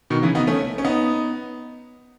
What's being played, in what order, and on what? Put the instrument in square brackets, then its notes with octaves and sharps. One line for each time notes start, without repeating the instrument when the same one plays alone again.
[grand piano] B2 D#3
C#3 E3
B3 D#4
A3 C#4
C#4
B3 D#4